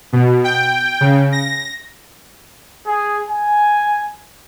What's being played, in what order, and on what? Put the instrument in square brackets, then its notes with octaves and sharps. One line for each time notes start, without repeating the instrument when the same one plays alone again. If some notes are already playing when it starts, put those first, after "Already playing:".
[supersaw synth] B2
G5
C#3
A#6
[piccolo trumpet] G#4
G#5